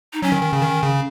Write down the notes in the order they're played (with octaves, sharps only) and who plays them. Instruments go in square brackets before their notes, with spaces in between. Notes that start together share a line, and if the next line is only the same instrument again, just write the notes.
[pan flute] D#4
[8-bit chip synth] F#3 [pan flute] C#4
[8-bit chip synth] D#3
D#3
C#3
D#3
C#3